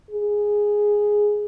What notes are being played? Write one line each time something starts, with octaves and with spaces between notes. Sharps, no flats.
G#4